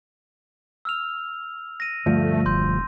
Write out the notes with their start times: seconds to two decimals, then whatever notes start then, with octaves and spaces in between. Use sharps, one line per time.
0.85 E6 F6 F7
1.80 A#6 D#7
2.06 D2 G2 F3 A3
2.46 E1 C6 G6